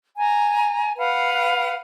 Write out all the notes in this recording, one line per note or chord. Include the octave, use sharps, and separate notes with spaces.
G#5 A#5
B4 F5 F#5